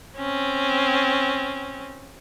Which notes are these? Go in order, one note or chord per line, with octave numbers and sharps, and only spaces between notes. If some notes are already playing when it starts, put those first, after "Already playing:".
C4 C#4